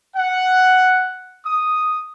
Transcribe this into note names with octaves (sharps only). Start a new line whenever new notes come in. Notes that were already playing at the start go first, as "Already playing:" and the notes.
F#5
D#6